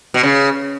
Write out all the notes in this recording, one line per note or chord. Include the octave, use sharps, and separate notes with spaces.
B2
C#3